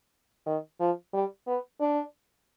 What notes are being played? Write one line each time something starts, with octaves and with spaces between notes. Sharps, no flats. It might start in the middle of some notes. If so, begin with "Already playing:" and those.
D#3
F3
G3
B3
D4